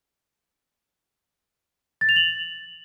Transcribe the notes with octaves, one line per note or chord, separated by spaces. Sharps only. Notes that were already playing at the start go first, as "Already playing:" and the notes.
A6
F7
F#7